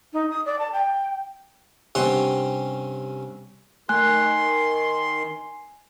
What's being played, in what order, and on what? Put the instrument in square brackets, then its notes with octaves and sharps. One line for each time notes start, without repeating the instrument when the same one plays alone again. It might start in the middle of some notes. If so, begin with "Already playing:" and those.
[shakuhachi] D#4
D#6
D5
A5
G5
[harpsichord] G2 C3 C#4 F#5 C6 C#6
[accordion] D#3 C6 [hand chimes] A3 G#5 F#6
[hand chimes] G#5